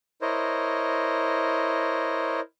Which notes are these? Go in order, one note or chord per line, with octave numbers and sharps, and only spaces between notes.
E4 A#4 C5 C#5 D#5